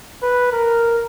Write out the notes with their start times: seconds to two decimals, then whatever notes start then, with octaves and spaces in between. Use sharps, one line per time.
0.23 B4
0.52 A#4